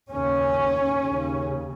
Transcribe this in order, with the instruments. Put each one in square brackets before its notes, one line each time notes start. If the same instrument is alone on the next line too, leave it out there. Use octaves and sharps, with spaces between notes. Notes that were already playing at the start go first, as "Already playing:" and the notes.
[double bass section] D#2 C#3 C#4
D#2 C#3